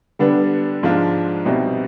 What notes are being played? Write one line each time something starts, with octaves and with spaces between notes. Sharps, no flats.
D3 G3 B3 D4
G#2 F3 G#3 D4 F4
C2 B2 G3 C4 D#4